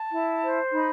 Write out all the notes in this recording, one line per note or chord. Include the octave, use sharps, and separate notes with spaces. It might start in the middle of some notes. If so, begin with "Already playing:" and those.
Already playing: A5
E4
C5
D#4 B5